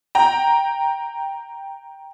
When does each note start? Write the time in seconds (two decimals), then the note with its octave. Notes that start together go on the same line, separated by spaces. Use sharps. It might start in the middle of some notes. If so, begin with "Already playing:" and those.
0.15 G5 A#5